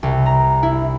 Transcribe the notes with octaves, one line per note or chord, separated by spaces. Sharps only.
C2
A#5
E4